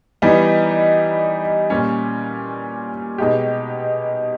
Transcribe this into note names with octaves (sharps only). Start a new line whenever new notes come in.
E3 G3 B3 D#4
A#2 G3 C#4
B2 G#3 D#4 G4